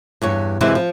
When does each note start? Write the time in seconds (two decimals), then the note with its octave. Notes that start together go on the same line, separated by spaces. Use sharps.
0.22 E2 G2 C#5
0.61 F#2 C3 E3 G#3 C4 E4
0.75 F3